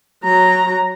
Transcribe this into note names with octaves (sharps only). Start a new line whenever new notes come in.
F#3 A#5